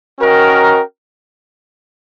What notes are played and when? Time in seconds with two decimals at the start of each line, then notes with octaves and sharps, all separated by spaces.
0.19 C#4 F#4 A#4 D#5 G5